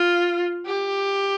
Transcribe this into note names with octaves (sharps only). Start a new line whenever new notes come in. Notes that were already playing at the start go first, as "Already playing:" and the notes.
Already playing: F4
G4